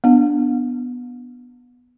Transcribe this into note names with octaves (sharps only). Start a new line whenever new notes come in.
B3 D4